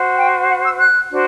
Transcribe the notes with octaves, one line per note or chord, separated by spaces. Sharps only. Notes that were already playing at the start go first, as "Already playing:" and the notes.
Already playing: F#4 C5
G5
F#5
E6
F#6
D4 F#4 C5